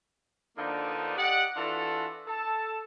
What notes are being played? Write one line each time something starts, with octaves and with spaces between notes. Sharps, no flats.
D3 F3 A#3 B3 D4 D#4
G4 D5 D#5 F#5
E3 D4 F4 F#4 A4
A4 A5